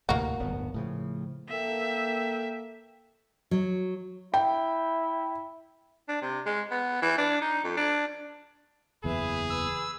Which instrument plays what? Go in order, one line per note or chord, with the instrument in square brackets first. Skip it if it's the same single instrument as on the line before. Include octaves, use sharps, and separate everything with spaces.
[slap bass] D2 A2 C3 [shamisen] A#3 F#4
[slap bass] D1 G1 B3
A2 C#3 F3
[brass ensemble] A#3 A4 G5 [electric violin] E5
[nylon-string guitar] F#3
[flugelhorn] E4 [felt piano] G5
[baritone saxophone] D4
C3
G#3
B3
E3
D4
D#4
F2
D4
[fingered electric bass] F#1 E2 [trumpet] G#4 [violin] B4 E5
[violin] B4 [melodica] E6